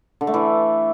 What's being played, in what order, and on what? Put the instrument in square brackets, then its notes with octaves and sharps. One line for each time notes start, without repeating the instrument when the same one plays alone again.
[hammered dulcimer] D3
A3
E3